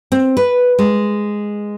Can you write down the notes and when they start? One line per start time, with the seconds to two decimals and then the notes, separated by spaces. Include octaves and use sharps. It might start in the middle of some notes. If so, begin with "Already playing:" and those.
0.12 C4
0.37 B4
0.79 G#3